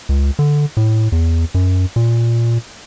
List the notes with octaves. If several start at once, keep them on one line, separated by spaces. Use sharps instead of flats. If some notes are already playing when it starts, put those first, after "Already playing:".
C#2
D3
A2
E2
F#2
A#2